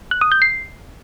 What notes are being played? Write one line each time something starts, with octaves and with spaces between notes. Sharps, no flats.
F#6
D#6
G6
C7